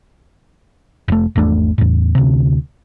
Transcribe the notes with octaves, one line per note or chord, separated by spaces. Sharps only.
F1 A3
G#1 E2 A3 D4
E2 A2
D2 C3